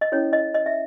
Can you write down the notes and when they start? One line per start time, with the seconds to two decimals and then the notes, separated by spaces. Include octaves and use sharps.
0.01 D#5
0.12 C#4 E4 A4 C#5
0.33 D#5
0.54 D#5
0.66 E5